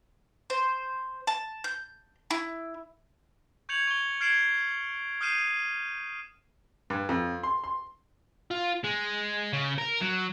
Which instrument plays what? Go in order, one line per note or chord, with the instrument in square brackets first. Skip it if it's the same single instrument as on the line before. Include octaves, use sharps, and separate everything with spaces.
[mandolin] C5
A5
G6
E4
[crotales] C#6 G6 G#6 C#7 F7 F#7
C#6 G7
F6 G#6 C7 D7 E7 F#7
D#6 F6 G6 C7 D#7 E7
[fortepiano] G2
F2
C6
C6
[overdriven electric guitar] F4
G#3
C#3
A#4
F#3